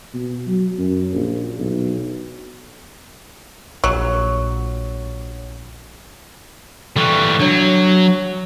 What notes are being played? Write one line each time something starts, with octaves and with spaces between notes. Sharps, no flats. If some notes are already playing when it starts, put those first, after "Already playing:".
B2
F#3
F#2
A#1
B1
A#1 F#3
E3 G3 A4 C#6 F#6
F#3 D4 C#5